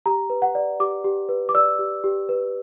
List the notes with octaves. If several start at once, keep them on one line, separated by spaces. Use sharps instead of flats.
G4 A#5
B4
F#5
D5
G4 D6
G4
B4
D6
D5 E6
G4
G4
B4